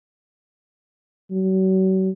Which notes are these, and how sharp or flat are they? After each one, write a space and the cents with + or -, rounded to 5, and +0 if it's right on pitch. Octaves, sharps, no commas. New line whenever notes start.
F#3 +40